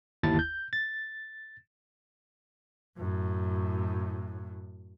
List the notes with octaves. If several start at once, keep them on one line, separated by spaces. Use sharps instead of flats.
G1 D#2 E4 A5 A6
G6
A6
F#2 A2